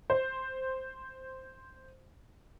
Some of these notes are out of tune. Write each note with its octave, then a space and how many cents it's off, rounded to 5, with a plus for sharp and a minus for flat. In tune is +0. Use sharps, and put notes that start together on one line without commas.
C5 +0